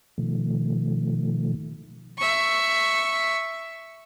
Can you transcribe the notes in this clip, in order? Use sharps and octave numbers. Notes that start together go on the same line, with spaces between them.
B2 D#3 F3 A3
E5 C#6